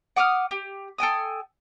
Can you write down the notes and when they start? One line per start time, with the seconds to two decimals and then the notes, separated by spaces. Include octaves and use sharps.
0.16 F#5 D6 D#6 F6
0.51 G4
0.99 A4 G5 G#5 D#6